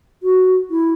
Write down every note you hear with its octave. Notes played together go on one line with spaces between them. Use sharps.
F#4
E4